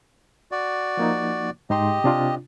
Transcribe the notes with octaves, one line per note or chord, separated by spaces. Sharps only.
F#4 D5
F3 A#3 D#4
G#2 D#4 G4 D#5 C6
C3 D4 F4